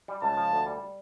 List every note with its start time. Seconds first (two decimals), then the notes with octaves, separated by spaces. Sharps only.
0.08 G3
0.22 C#2 A5
0.37 F3
0.52 D2
0.66 G3